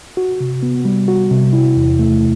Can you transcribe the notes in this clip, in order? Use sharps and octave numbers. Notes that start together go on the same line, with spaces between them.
F#4
C3
B3
G3
F#4
C3
E4
E2
A3